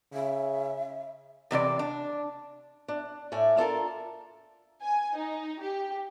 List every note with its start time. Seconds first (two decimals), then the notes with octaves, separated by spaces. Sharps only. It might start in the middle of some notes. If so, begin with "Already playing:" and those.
0.14 C#3 E5
1.51 E2 C3 D4 D5
1.79 D4
2.88 D4
3.32 A2 A3 D5 G#5
3.57 D4 F4 A4 A#4
4.82 G#5
5.18 D#4
5.62 G4